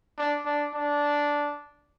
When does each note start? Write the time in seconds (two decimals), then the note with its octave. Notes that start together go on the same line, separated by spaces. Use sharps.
0.18 D4
0.45 D4
0.74 D4